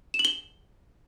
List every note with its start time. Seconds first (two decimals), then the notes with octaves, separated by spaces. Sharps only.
0.14 E7
0.19 F#7
0.25 G7